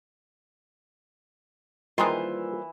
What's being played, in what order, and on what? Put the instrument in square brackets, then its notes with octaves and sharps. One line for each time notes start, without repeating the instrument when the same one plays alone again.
[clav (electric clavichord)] D#3 G#3 [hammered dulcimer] E3 [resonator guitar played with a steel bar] G3 B4 C5 [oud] A#3 F4